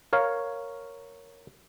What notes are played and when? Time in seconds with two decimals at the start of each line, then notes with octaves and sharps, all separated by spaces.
0.13 A#4 C#5 F5